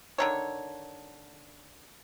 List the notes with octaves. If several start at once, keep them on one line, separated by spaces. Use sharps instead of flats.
D3 D#3 C#5